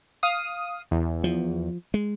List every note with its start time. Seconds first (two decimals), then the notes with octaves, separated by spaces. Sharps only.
0.23 F5 D#6
0.91 E2
1.24 F3
1.94 G#3